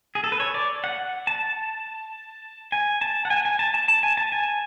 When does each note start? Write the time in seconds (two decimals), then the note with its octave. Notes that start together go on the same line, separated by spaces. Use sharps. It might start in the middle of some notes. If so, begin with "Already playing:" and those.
0.15 G#4
0.24 A4
0.32 B4
0.40 C#5
0.54 D5
0.84 F#5
1.27 A5
2.72 G#5
3.01 A5
3.25 F#5
3.30 G#5
3.45 G#5
3.59 A5
3.74 A5
3.88 A5
4.03 G#5
4.17 A5
4.32 G#5